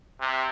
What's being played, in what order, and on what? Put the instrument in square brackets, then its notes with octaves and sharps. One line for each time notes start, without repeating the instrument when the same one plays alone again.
[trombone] C3